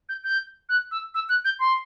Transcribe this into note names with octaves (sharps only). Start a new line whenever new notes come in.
G6
G6
F#6
E6
E6
F#6
G6
C6